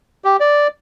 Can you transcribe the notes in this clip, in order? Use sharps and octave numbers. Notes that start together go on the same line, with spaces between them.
G4
D5